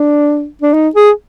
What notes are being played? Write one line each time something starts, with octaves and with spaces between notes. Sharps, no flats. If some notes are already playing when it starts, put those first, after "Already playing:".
Already playing: D4
D4
D#4
G#4